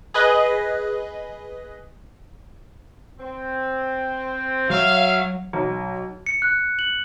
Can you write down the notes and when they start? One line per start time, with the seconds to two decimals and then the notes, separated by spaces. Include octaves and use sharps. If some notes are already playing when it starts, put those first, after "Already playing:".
0.14 G#4 B4 D#5 F#6
3.19 C4
4.70 F#3 C#5 E5 F5
5.53 B1
6.26 C#7
6.42 F#6
6.79 F#7